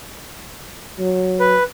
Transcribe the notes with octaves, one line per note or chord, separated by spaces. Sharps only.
F#3
B4